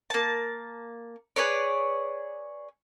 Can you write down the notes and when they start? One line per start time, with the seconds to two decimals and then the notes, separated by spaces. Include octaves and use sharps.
0.10 A#3 A5
1.36 G#4 B4 C#5 D5